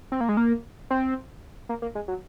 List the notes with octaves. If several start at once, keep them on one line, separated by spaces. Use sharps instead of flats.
C4
A#3
G#3
A#3
C4
A#3
A#3
G#3
F#3